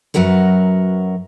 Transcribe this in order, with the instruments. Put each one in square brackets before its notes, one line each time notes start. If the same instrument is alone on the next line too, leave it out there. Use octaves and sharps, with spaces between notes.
[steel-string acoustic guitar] F#2 F#3 F#4 A#4 B4